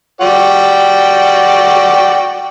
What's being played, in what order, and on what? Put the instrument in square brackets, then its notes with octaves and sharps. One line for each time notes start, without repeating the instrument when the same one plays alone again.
[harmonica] F#4 D5 G5